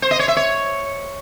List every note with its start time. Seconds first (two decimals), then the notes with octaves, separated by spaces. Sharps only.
0.02 C5
0.11 D#5
0.19 C#5
0.28 E5
0.36 C#5